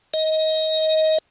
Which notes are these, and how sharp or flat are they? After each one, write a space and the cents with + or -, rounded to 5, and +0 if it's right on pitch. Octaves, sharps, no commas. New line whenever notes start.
D#5 +20